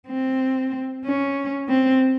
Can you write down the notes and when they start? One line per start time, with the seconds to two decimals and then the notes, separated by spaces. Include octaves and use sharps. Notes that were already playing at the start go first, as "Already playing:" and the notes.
0.08 C4
1.05 C#4
1.69 C4